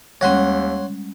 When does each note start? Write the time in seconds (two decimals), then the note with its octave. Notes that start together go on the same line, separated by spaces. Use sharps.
0.21 D#2 G3 G#3 C#4 C#5 F#5 C6